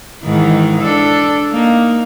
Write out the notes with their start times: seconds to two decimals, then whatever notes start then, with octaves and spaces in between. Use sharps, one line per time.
0.24 G#2 D#3 E3
0.80 D4 A4
1.51 A#3 D#4